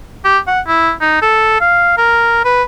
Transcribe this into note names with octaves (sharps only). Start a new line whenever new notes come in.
G4
F#5
E4
D#4
A4
F5
A#4
B4